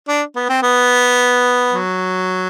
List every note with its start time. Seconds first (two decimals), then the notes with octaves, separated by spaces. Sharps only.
0.08 D4
0.36 B3
0.49 C4
0.63 B3
1.72 F#3